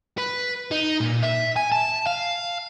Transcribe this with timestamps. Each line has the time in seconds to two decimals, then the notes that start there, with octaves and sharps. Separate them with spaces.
0.18 B4
0.71 D#4
1.01 A#2
1.22 E5
1.56 G#5
1.72 A5
2.07 F5